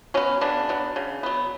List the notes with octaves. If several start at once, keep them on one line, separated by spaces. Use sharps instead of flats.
F#3 B3 C#4
C#3 B3 D4
F#3 B3
C#3
F#3 B3